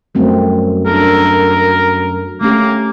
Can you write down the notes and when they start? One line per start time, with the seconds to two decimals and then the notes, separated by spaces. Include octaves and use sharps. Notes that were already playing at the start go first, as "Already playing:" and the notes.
0.15 F#2 G3 A3 C4
0.86 D4 A4 A#4
2.41 A3 A#3 C#4 G4